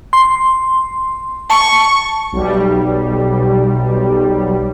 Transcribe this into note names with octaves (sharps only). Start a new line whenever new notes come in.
C6
A5 C#6
B1 G3